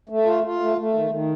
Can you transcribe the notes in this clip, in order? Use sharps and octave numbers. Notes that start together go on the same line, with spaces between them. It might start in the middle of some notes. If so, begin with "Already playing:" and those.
A3
F4
F4
A3
A3
D#3
D#3